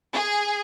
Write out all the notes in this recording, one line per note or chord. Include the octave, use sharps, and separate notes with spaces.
G#4